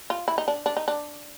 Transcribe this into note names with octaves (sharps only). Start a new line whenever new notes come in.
F4
E4
D#4
D4
D4
D#4
D4